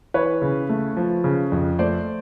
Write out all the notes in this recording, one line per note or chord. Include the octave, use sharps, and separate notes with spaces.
E3 B4 C#5
C#3
A3
F3
C#3
F2
A3 C5 D5